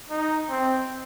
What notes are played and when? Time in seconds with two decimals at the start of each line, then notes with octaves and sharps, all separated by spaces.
0.10 D#4
0.50 C4